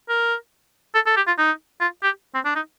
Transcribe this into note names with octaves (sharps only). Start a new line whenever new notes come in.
A#4
A4
A4
G4
F4
D#4
F4
G4
C4
D4
D#4